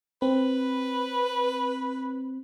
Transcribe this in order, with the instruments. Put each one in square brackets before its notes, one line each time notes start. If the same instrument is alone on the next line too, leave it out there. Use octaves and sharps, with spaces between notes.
[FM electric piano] C4 [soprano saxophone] B4